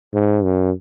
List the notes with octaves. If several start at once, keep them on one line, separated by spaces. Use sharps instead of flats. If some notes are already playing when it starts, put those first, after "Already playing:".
G#2
F#2